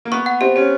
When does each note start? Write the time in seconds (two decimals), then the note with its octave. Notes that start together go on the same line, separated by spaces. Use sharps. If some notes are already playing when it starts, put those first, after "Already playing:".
0.05 A#3
0.12 B3 C#6
0.26 F#5
0.41 C4 G4
0.56 C#4 G4